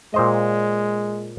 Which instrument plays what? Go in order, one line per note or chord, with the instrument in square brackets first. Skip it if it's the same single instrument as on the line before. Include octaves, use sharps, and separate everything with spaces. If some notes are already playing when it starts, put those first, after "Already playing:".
[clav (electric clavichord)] A#2 C5 D#5 [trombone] G#3